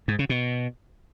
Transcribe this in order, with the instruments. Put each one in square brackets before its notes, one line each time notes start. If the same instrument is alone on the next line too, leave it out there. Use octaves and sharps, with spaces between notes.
[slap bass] G#2
C#3
B2